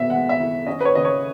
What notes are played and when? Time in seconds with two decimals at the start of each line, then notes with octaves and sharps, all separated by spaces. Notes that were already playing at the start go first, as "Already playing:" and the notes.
Already playing: B2 G#3 E5
0.10 G#3 F#5
0.29 E5
0.39 E4
0.67 C#4 D#5
0.81 B4
0.85 C#5
0.95 C#3 D#5
1.05 C#5